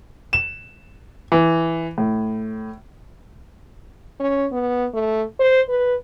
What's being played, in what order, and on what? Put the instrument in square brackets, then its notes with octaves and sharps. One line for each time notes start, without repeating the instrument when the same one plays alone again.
[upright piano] E7
E3
A2
[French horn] C#4
B3
A3
C5
B4